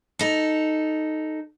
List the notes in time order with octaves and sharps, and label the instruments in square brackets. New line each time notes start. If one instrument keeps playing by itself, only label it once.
[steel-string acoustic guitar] D#4 A4